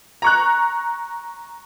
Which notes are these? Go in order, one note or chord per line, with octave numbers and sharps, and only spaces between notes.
A#5 C#6 F#6